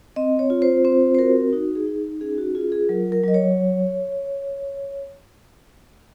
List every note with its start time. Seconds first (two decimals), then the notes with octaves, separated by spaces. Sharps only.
0.16 C4 D#5
0.39 C#5
0.50 F4
0.62 C5
0.85 C4 C5
1.14 C5
1.19 F#4 A#4
1.53 D#4 F#4
1.75 G#4
1.87 D#4
2.21 C#4 G#4
2.38 F#4
2.55 F4 G#4
2.72 G#4
2.89 F#3 A#4
3.12 A#4
3.24 F#3 D#5
3.34 C#5